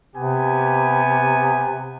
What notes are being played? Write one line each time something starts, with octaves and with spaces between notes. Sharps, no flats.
C3 B3 G4 G#5